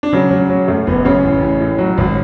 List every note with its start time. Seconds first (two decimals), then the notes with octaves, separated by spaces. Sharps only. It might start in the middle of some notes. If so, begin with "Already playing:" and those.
0.03 D4
0.13 C#3 F#3 C#4
0.31 F#3
0.49 F#3
0.68 F#2 A3
0.87 F#1 B3
1.05 F#2 C#3 C#4
1.24 A1
1.42 A1
1.60 A2
1.78 F#3
1.98 G#1